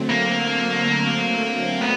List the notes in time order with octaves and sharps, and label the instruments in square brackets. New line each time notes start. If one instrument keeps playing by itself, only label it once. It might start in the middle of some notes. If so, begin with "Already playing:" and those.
Already playing: [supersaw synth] D3 F#3 A3 C4
[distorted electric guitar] A#3
B3